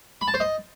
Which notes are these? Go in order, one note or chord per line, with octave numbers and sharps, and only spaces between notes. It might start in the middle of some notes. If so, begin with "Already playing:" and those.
B5
A5
C5
D#5